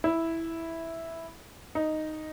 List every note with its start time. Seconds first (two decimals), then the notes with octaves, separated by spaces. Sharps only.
0.04 E4
1.75 D#4